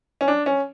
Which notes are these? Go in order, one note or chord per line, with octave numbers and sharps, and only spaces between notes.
C#4
D4
C#4